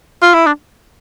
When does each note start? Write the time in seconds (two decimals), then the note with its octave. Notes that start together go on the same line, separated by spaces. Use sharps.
0.22 F4
0.34 E4
0.46 D4